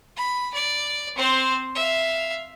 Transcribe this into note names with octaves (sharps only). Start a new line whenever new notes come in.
B5
D5
C4 C5
E5 F5